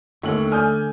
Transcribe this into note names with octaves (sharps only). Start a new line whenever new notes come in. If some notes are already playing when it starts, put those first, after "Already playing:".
D#2 D3 A3 C#4 F#7
D5 G#5 D#6 F6 G6